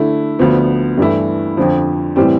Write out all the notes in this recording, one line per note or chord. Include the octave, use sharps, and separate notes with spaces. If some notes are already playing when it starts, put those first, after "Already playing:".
Already playing: D3 A3 E4
D2 D3 F3 B3
G2 E3 A3 E4
F2 D3 F3
A2 E3 G3 C4